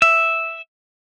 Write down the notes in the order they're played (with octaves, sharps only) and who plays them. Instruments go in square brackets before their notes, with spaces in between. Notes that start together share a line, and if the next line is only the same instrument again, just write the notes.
[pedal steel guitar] E5